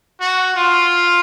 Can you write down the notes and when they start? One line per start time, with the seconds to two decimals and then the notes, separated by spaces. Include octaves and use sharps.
0.21 F#4
0.56 F4